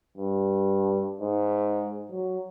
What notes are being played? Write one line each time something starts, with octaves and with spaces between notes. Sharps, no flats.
G2
G#2
F#3